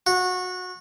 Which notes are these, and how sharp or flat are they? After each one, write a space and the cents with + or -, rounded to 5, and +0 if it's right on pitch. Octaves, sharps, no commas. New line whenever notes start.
F#4 -20